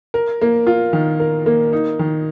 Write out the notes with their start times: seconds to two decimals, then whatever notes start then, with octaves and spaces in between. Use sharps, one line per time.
0.14 A#4
0.41 A#3
0.67 F4
0.93 D#3
1.20 A#4
1.46 A#3
1.73 D#4
1.99 D#3